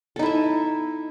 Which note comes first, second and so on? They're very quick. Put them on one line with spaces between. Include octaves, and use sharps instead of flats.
A4 D#4 E4 E5